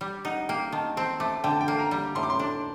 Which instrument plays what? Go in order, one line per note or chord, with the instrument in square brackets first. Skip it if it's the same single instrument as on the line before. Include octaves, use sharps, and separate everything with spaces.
[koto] G3
[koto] D#4 [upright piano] F#5
[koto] A#3 [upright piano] G5
[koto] D#3 [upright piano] A5
[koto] C4 [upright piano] A5
[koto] A3 [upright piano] D6
[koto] D3 [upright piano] G5
[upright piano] A5
G5
[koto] A#3
[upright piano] A#5
[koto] G3
[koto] A2 [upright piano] C6
[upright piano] D6
C6
[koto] D4